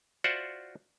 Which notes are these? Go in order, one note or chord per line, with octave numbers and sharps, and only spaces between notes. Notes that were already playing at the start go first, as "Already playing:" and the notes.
F4 F#4 C5 D5 E5 F#5